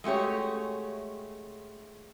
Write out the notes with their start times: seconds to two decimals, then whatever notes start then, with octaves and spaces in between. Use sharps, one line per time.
0.04 G#3 A3 F#4 G4 C#5